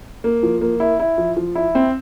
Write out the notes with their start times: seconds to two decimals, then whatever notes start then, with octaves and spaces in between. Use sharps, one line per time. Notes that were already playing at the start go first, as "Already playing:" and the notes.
0.24 A#3
0.43 F3
0.61 A#3
0.80 E4
1.00 E4
1.18 F3
1.37 F3
1.55 E4
1.75 C4